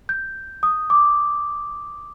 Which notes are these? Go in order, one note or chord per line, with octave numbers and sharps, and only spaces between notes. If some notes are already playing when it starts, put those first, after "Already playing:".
G6
D#6
D6